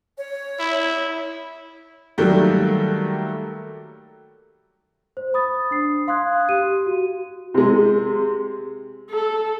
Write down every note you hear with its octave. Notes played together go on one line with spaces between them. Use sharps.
C#5
E4
D#3 F#3 G3 A3 A#3
C5
B5 D#6 A6
D4 C7
F5 C6 D#6 F#6 G#6
G4 D#7
F#4
C3 G#3
A4